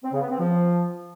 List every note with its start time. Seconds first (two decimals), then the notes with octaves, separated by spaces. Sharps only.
0.03 C4
0.12 C#3
0.21 B3
0.30 C4
0.38 F3